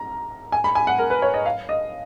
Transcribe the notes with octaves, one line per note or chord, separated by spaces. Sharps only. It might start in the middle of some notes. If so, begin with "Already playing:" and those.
Already playing: A#5
G#5
B5
G#5
F#5
A#4
B4
C#5
D#5
F5
D#5